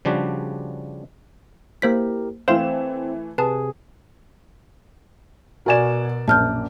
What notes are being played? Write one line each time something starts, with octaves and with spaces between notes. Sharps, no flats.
C#3 F3 G3 D4 F#4
A#3 E4 G4 A#4 C5 B6
E3 A3 C4 C5 F5 C6 E7
C3 G#4 B4 A5
B2 F#4 A#4 D5 G#5 E7
A#1 F#2 A5 F6 G6